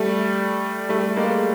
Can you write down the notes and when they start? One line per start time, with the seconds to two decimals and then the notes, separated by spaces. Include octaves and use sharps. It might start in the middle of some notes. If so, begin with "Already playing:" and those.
Already playing: G3 A3
0.89 G3 A3
1.16 G#3 A#3